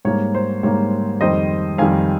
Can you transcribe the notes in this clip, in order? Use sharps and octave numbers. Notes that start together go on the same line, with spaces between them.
G#2 G3 A#3 C#5
C5
G#2 G3 A#3 C#5
F2 D#3 G3 C5 D#5
F2 D#3 G3 F5 G#5